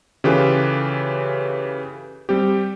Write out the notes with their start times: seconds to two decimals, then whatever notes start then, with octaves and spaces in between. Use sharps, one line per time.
0.24 C#3 E3 F4 G4 A4 B4
2.29 G3 C4 G4